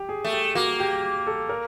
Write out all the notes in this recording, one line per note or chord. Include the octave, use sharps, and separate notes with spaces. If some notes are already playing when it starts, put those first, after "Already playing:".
Already playing: G4
G#4
A3
G4
A#3 F#4
G4
A4
A#4